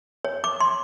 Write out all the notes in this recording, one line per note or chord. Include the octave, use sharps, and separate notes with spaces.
C#5
D6
C6